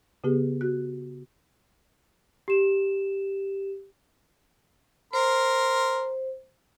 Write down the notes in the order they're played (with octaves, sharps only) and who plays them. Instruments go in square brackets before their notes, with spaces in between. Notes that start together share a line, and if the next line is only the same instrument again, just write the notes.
[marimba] C#3 B3 G4 G#4
F#4 F#6
[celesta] G4 E7
[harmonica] A#4 C6 [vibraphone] C5